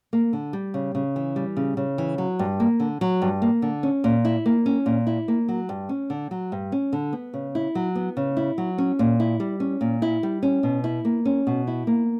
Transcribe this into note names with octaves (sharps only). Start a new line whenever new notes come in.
A#3
D3
G3
C#3
C#3
E3
G3
C#3
C#3
E3
F#3
G2
A#3
D3
F#3
G2
A#3
D3
C#4
A#2
E4
A#3
C#4
A#2
E4
A#3
F#3
G2
C#4
D3
F#3
G2
C#4
D3
B3
C#3
E4
F#3
B3
C#3
E4
F#3
C#4
A#2
E4
G3
C#4
A#2
E4
G3
C#4
B2
E4
A#3
C#4
B2
E4
A#3